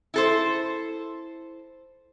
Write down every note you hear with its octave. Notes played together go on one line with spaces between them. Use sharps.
E4 A4 C5